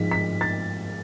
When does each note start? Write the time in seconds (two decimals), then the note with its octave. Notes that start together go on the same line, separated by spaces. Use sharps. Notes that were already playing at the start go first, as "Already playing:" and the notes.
Already playing: G#2 F3 B6
0.11 B6
0.41 A6